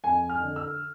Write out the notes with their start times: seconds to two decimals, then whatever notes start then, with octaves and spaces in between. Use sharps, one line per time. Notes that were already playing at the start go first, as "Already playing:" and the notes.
0.03 F2 G#5
0.30 F6
0.43 D3
0.56 E6